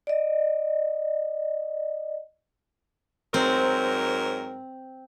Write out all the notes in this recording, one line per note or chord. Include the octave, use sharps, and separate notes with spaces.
D5 D#5
G#2 F#3 C4 A#4